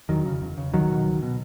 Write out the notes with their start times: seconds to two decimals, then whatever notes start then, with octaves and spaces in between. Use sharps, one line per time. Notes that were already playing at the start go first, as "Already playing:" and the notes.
0.09 E2 D#3 F#3
0.26 C#3
0.41 E2
0.58 C#3
0.73 C#2 D#3 F#3
0.90 B2
1.06 C#2
1.22 B2